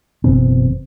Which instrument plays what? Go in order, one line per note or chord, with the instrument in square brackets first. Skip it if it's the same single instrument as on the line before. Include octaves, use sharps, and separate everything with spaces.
[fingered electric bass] F#1 B2 E3 C4